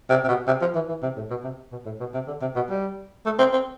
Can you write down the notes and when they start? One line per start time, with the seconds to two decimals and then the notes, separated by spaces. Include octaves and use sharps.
0.10 C3
0.24 C3
0.28 B2
0.47 C3
0.61 F3
0.75 E3
0.89 E3
1.03 C3
1.17 A2
1.30 B2
1.44 C3
1.72 B2
1.86 A2
2.00 B2
2.14 C3
2.27 D3
2.41 C3
2.55 B2
2.70 G3
3.25 A3
3.39 C4
3.53 C4